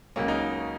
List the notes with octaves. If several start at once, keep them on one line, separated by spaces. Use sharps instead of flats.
C#2 C#3 F#3 A#3 C#4
D#4